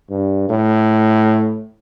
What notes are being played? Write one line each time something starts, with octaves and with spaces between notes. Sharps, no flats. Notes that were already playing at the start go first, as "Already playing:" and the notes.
G2
A2